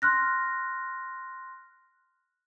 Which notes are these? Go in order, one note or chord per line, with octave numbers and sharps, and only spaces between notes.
C6 F6 F#6 A#6